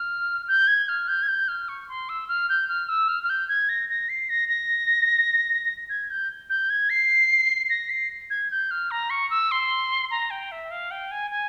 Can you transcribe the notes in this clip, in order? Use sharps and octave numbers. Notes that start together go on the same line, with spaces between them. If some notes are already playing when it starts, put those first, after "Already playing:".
Already playing: F6
G6
G#6
F6
G6
G#6
G6
F6
C#6
C6
E6
F6
G6
F6
E6
F6
F6
G6
G#6
A#6
A#6
C7
A#6
A#6
G#6
G6
G6
G#6
C7
A#6
C7
G#6
G6
F6
A#5
C#6
E6
C6
A#5
G5
E5
F5
G5
G#5
G#5